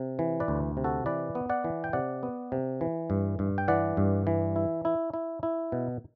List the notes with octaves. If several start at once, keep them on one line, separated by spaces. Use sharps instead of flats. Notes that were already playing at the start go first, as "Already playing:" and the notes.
Already playing: C3
E3
B4 D5
D2
C3
F#4 A4
E3 B4 D5
B3
D5 F#5
E3
G5
C3 D5 F#5
B3
C3
E3
G2
G2
G5
E3 D5 F#5
G2
E3
E4
E4
E4
E4
B2